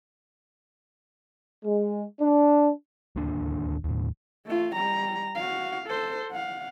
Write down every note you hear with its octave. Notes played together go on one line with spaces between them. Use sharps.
G#3
D4
D1 D#2 A#3 D4
D#2 A2
A3 F4
G3 A#5
F#4 F5
A4 C5
F5 F#5